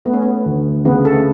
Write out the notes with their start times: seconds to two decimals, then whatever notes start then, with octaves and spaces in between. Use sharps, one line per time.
0.05 A3 B3
0.13 C#4
0.22 B3
0.46 D2
0.85 C#3 B3
1.04 A3 A4